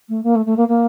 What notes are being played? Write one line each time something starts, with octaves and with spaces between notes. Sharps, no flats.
A3
A#3
A3
A3
A#3
A#3